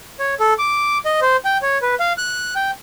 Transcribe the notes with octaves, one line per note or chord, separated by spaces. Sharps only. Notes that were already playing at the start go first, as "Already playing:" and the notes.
C#5
A4
D6
D#5
C5
G5
C#5
B4
F5
F#6
G5